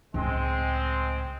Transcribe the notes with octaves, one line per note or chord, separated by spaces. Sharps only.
C#2 A2 G#3 C4